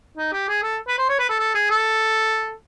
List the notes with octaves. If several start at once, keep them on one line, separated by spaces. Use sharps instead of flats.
D#4
G4
G#4
A4
B4
C5
C#5
B4
A4
A4
G#4
A4